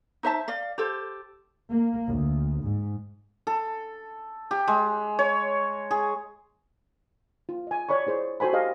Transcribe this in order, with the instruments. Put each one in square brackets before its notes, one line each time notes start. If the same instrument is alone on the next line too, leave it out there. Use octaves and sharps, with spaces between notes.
[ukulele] D#4 C5 E5 A5
D5 F5
G4 A4 C5
[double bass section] A#3
D2
G#2
[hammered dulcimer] A4
G4
G#3
C#5
G#4
[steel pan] F4
D#5 G#5
C#5 D5 B5 C#6
E4 G#4 C5 D5
F#4 A4 C5 G#5 B5
G4 A4 D#5 F5